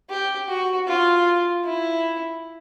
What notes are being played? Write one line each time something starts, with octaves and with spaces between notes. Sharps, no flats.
G4
F#4
F4
E4